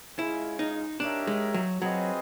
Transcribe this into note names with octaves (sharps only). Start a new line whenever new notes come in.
G#3 C#4 E4 F4 G#4
D#4
D4 D#4 G4 A#4 C#5 E5
G#3
F#3
F#3 C4 F4 G#4 B4 D#5